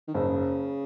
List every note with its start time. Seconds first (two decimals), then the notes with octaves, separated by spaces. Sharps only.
0.08 D#3
0.14 F#1 C#3